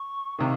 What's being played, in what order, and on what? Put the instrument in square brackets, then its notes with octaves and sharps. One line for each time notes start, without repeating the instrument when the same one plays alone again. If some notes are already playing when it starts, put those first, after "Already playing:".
Already playing: [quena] C#6
[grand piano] C3 D#3 [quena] F5